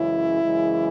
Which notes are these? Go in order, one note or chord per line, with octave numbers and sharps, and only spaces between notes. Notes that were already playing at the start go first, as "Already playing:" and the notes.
Already playing: F#2 C#3 E3 G#3 E4
F#2 C#3 E3 G#3